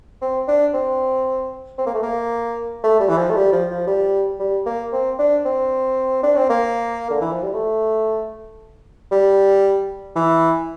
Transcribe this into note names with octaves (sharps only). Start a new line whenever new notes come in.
C4
D4
C4
C4
A#3
A3
A#3
A3
G3
E3
F3
A3
G3
F3
F3
G3
G3
A#3
C4
D4
C4
D4
C4
A#3
D3
E3
F3
G3
A3
G3
E3